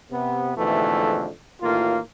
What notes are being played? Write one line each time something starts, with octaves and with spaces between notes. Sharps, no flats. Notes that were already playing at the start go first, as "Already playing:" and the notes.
C3 B3
F2 G#2 B2 D3 E3 A3
A1 A2 D#3 A#3 F4